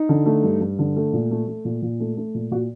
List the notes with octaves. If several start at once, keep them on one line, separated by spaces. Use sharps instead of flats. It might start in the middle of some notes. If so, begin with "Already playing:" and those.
Already playing: D#4
D3
A3
G2
G2
D3
A3
A#2
A3
A3
A#2
A#2
A3
A3
A#2
A#2 F#4